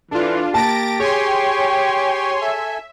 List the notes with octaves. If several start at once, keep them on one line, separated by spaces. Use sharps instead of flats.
E3 D4 F4 A4
A#3 G4 A5 A6 A#6 D7
G#4 C#5 G5 G#5 C6 C#6
A4 E5 G#5